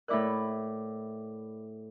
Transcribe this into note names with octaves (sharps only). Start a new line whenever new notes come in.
A2 E4 A#4 D5 D6 F#6